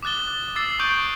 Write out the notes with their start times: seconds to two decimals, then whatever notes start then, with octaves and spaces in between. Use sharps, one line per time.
0.03 D6 D#6 F#6 A6 G7
0.56 D6 E6 A6 C7
0.79 C#6 D#6 G6 C7 D7